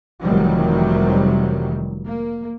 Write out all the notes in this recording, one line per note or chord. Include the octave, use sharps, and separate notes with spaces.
F1 C3 D#3 E3 F#3 G3
A#3